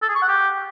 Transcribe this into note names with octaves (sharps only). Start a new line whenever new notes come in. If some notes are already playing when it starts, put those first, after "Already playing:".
A4
G#4
C#6
F#5
G4